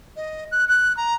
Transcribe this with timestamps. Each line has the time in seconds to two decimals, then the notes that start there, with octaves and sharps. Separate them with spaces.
0.16 D#5
0.52 F#6
0.68 F#6
0.97 A#5